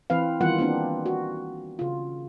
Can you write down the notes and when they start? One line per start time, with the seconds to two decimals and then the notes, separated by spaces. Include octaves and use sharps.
0.10 E3 C4 B4 F5
0.41 D#3 E3 G3 B3 F4 F#5
0.59 A#3 C4 D4
1.06 F#4
1.79 C#3 F4